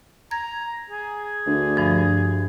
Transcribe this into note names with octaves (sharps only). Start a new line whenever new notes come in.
A#5 G#6
G#4
D2
G2 F3